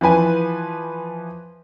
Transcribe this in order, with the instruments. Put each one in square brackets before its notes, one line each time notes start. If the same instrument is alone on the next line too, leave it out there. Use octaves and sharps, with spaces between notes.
[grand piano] E3 F3 B4 G#5